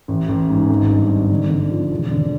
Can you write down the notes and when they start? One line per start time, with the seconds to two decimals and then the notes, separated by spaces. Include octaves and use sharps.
0.08 A1
0.29 A1
0.50 G#2
0.70 G#1
0.90 G2
1.10 D#3
1.31 D3
1.50 D3
1.71 F3
1.91 E1
2.11 D3